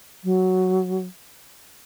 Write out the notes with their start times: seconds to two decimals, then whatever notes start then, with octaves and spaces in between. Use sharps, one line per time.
0.24 F#3